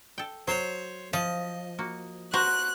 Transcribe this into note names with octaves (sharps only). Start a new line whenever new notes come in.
A4 G5
F#3 C5 C#5
F3 D#5
A#3 F#4
F#4 C5 A#5 F#6